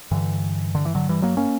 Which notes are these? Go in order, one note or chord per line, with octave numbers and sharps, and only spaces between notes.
G2 D3 E3
D3
E3
D3 F#3
E3 G3
F#3 A#3
A#3 C#4